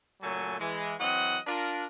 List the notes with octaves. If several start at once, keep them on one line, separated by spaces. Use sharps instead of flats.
A#2 C#3 F#3 A3 A4 G#5
E3 G#3
E3 F#3 C4 D#5 F#5
D4 F4 A#4